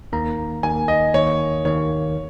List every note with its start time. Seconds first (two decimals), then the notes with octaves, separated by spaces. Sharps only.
0.13 D#2 D#3 A#3 A#5
0.63 D#2 D#3 A#3 G#5
0.88 D#5
1.14 D#2 D#3 A#3 C#5
1.65 D#2 D#3 A#3 C#5